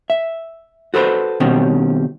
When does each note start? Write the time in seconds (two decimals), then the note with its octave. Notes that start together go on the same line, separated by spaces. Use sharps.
0.10 E5
0.94 F#4 A4 B4 C5
1.40 B2 D#3 G3 C4 C#4